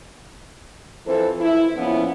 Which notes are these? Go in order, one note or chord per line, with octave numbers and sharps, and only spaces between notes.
E3 F3 C4 A4 C5
E4
A#2 F3 B3 C#4 E4